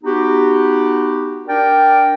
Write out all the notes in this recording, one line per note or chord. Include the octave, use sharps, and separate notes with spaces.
B3 D#4 F#4 G4
D4 A#4 D5 G5